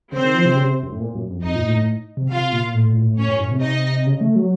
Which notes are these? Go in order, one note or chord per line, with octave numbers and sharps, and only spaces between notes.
C#3 C4 C5
D#3
F3
C3
C#3
C3
F#2
A2
A#2
F#2
F2
F2 D#4 D#5
A#2
A2
A2
C3
C3 F4 F5
A#2
A2
A#2
A2
A2 C#4 C#5
F#2
A2
C3
D#4 D#5
C#3
A3
F#3